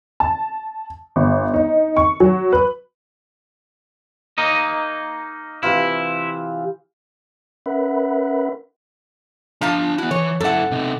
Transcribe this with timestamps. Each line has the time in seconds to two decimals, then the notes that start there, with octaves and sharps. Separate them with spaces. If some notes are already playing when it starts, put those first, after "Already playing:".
0.20 A5
1.16 G1
1.54 D#4
1.97 C#6
2.20 F#3
2.52 B4
4.38 A#3 D#4 D#5
5.63 C3 E3 E4 F4
7.66 C#4 A#4 B4 E5 F#5 B5
9.61 F3 D4 F5 A5 A#5
9.98 B3 E4 F#4
10.11 E3 C#5
10.40 F#2 E4 A4 F#5
10.71 C3 D#4